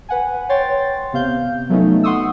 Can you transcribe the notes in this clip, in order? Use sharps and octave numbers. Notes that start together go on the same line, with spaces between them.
B4 F#5 G#5
C#5 G5 C6 A6
C3 B3 F5 G6
F#3 A3 B3 C#4 D#4
F#5 C6 C#6 D#6 E6